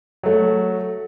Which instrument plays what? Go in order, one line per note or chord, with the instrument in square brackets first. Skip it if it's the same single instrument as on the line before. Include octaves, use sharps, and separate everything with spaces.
[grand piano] F#3 A3